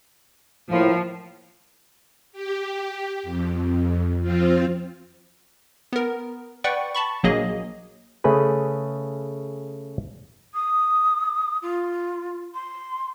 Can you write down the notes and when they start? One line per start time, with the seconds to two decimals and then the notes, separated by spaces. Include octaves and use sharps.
0.71 A2 F3 A#3 E4
2.32 G4
3.23 F2
4.20 F3 C4 F4
5.93 B3 A#4
6.64 B4 D5 F#5 G5 C#6
6.95 A5 B5 C#6
7.23 A#1 F#3 A#3 G#4 D#5
8.24 C#3 A3 C#4 G#4 B4
10.54 D#6
11.62 F4
12.55 C6